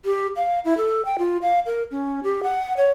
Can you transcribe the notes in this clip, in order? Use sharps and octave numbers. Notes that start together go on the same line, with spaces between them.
G4
F5
E4
A4
G5
F4
F5
A#4
C#4
G4
F#5
C#5